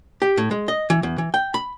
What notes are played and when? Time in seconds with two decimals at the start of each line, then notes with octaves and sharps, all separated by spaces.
0.22 G4
0.37 A2
0.51 G#3
0.68 D#5
0.90 E3
1.03 E2
1.18 E3
1.34 G5
1.54 B5